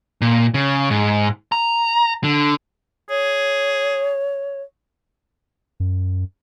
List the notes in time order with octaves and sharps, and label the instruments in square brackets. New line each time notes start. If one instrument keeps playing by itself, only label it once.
[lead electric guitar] A#2
C#3
G#2
A#5
D3
[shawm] G#4 [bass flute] C#5
[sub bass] F#2